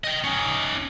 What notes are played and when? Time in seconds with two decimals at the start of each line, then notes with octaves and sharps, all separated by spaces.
0.04 D#5 G5
0.24 C#4 D#4